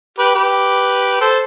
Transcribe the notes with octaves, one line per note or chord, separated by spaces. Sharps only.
G4 B4
G4 B4
A4 C5